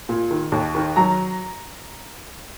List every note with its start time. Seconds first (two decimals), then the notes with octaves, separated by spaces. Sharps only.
0.09 A#2
0.31 D#3
0.52 D#2
0.75 D#3
0.96 F#3 A#5